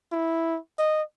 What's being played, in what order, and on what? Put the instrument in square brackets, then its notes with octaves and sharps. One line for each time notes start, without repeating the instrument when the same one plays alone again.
[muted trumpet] E4
D#5